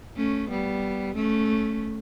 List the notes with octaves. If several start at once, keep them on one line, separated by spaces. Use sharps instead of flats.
A3 C#4
G3 B3
A3 C#4